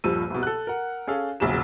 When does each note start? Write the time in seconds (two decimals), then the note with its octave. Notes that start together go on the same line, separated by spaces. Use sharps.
0.04 D#1 G2 F3 E6 D#7
0.30 C2 B2
0.43 A4 F#6
0.67 A#4 F#5
1.07 C#4 G#4 A4 F5
1.40 E1 A#1 C#3 F#3 E7